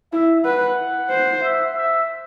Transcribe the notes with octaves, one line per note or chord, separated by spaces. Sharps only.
E4 E5
B4 F#5
C5
E5
E5